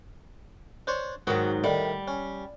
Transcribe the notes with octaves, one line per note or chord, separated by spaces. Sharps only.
D4 C5 C#5
G#2 D#3 F#3 F#4
A2 D#3 G3
C#4